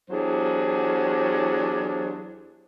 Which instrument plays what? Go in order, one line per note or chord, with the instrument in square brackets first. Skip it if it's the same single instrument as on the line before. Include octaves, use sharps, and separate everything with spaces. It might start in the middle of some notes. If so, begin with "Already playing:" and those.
[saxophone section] E2 F#3 D4 G4 G#4 C5